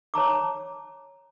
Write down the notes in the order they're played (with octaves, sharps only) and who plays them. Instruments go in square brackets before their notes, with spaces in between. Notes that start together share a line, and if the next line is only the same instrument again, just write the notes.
[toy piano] C#5 A5 A#5 D6